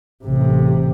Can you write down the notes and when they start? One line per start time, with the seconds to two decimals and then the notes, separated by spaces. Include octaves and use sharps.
0.25 A1 C3